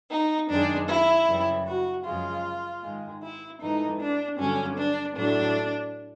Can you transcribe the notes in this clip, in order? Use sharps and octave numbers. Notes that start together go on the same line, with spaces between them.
D#4
F#2 D#3 G#3 D4
E4
F#2 C#3 E3 G3
F#4
F#2 C#3 F3 G#3 F4
G#2 D#3 G#3
E4
G#2 E3 A3 D#4
D4
G2 D3 F#3 C#4
D4
A2 F#3 A3 D4